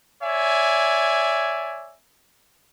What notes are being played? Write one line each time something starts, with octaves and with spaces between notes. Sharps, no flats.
C#5 D5 E5 G#5